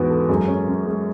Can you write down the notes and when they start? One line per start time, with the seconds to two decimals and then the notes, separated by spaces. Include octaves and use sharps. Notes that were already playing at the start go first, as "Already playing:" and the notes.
Already playing: E2 G#2 E3 B3 F#4
0.10 A4
0.29 F#2 G#3
0.48 C#4
0.66 F#2
0.86 G#3